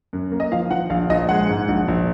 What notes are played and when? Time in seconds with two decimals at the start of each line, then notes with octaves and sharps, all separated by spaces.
0.13 F#2
0.32 A#3
0.40 D#5
0.52 F3 F5
0.71 F3 F#5
0.90 A#1 F5
1.10 A#1 D#5
1.29 G#3 F#5
1.49 G#2
1.68 A#1
1.88 A#1